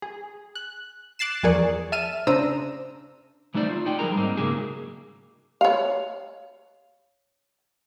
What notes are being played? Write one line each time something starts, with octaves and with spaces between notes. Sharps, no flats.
G#4
F#6
D6 F#6 A6 C7 E7
E2 F3 G#4 A#4 D5 C#6
E5 A5 F6 D#7 E7
C#3 D4 C5 A#5 E6 D#7
E3 A3 D#4 C5 D5
F4
D#4 D5 G5
F3 G3 G#4 A#4 A#5
G#2 A#3 C4 D#4
G#2 C#3 F#3 A#3 G#4
C#5 F5